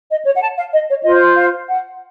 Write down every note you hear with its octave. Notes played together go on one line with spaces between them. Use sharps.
D#5
C#5
F#5
A5
F5
D#5
C#5
F4 C5 D#5
F5
F#5